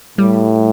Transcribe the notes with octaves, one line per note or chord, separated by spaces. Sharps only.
A2 G3